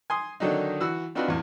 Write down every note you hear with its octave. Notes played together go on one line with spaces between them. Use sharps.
G#5 C6 D#6
D3 D#3 F#3 D4 D#4
E3 F#4 E6
C4 D4 D#4 F4 F#4 B4
A1 E2